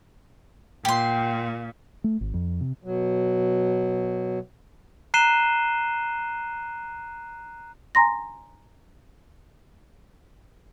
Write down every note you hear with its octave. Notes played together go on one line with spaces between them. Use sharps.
A#2 G4 C6
A3
G#1
F2
C3
B2 F#3
A#5 F#6 C7 D#7 E7 G7
G#5 A#5 C6 A#6